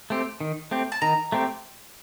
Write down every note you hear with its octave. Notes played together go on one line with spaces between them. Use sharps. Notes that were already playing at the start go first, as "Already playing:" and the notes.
A3 C4 G4
D#3
A3 C4 G4
A5
D#3 A#5
A3 C4 G4